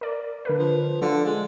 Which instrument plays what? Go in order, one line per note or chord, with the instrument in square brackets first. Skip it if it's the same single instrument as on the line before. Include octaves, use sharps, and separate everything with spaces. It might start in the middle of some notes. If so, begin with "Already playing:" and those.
[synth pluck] A#4 D5
D3 A#4 B4
[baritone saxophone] F3
[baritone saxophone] D3 [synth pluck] F3 F4
[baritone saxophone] G#3